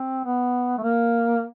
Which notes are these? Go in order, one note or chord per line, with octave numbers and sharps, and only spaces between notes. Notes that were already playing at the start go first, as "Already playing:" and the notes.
Already playing: C4
B3
A3
A#3